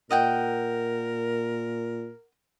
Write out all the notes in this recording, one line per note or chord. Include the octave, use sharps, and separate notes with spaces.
A#2 A#4 D#5 F#5 G5